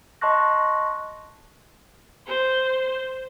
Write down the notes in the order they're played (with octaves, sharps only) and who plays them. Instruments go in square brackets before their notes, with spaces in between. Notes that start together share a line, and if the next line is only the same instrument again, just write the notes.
[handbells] D#5 A5 C6 C#6 F#6 A#6
[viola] C5